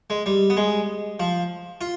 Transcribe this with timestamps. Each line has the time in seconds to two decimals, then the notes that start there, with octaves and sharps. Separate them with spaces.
0.10 G#3
0.26 G3
0.50 B3
0.57 G#3
1.20 F3
1.81 F4